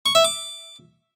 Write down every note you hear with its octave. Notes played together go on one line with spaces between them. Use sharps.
C#6
E5
D6